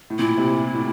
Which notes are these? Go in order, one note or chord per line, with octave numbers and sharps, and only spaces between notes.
A2
A#2 E4
C3
A2